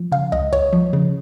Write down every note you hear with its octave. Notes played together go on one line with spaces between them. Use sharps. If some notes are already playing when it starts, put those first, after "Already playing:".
Already playing: F3
C#3 F5
C#2 D#5
C#2 C#5
F3
C#3